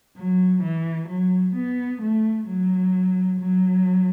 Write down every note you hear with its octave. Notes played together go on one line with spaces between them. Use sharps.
F#3
E3
F#3
B3
A3
F#3
F#3